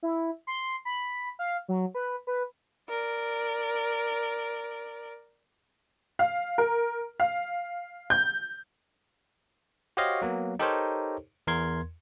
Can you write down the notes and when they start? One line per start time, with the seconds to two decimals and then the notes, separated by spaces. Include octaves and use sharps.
0.03 E4
0.47 C6
0.85 B5
1.39 F5
1.68 F#3
1.95 B4
2.27 B4
2.89 A#4 D5
6.19 F5
6.58 A#4
7.20 F5
8.10 G6
9.97 F#4 G4 C5 C#5 D#5 F5
10.22 F#3 A#3 B3
10.59 D#4 G4 A4 A#4 C5 C#5
11.47 E2 A#4 C6 G#6